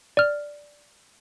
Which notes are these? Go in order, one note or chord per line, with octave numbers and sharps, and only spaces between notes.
D5 F6